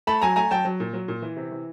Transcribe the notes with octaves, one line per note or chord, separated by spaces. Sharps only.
A3 A5 B5
F#3 G#5 A#5
A3 G#5 A#5
F#3 G5 A5
F#3
A#2
F#3
A#2
E3
C3
E3